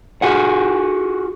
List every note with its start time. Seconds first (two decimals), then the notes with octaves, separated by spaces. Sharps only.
0.22 F4 F#4 G#4 F#5